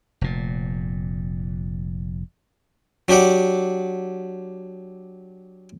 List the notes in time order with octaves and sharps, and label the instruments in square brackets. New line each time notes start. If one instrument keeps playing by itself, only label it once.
[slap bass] F1 A#2
[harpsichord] F#3 D4 G4 D5 F#5